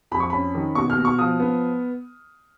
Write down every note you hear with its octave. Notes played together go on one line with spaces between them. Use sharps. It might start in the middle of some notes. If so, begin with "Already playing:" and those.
F2 B5
C#6
C#4 B5
D#3
B2 C#6
F6
B2
C#6
F3 D#6
B3